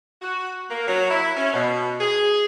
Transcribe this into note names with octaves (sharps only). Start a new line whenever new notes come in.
F#4
A#3
F#3
E4
C#4
B2
G#4